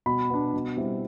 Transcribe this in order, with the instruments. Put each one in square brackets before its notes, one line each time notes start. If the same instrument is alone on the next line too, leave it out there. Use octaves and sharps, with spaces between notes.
[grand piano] B2 B5
B3 D4
B2
G3 C4 E4